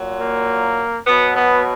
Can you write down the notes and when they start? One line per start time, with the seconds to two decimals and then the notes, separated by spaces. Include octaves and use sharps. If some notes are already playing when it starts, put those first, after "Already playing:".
Already playing: A#2 F#3
0.20 A#3
1.07 B2 F#3 B3
1.36 B3